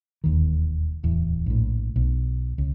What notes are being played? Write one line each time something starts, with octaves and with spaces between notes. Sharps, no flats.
E1 D#2 D#3
D1 E2
A#1 A2
B1
C#2